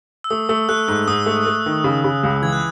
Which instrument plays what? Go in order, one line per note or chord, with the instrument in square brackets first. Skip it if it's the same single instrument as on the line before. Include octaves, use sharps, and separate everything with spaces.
[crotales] E6
[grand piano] A3 [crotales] D#6
[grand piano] A3 [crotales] E6
[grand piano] A3 [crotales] F#6
[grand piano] G#2 [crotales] F#6
[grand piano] G#2 [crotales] D#6
[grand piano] A3
A3
D#3
C#3
C#3
C#2
[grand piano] E3 [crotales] G#6
[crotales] F#6